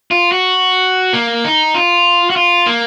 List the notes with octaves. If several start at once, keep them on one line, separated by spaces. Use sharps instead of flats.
F4
F#4
A#3
D#4
F4
F#4
F4
A#3